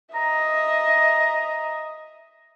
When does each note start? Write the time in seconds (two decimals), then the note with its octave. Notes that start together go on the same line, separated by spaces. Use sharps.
0.15 D#5 E5 A#5